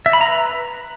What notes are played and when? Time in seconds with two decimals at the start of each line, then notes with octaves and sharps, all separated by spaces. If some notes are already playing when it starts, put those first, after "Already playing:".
0.06 E5
0.13 B5
0.21 A#5
0.28 B4